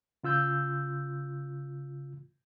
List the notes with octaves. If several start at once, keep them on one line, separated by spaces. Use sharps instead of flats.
C#3 F4 E6 G6